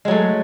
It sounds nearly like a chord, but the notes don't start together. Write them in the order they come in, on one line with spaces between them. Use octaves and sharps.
G#3 F#3 A3